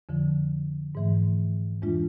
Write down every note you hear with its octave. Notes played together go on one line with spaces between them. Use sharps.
F2 D3 F3
G#2 E3 A3
F2 E3 G#3 D4 F4